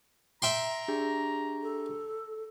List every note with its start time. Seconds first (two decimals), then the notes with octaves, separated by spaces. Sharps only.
0.42 E5 G5 A#5 C6
0.88 D4 G4 G#4
1.63 A4